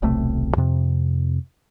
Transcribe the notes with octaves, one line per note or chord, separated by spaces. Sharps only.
D#1 B1 C3 A3
F2 C3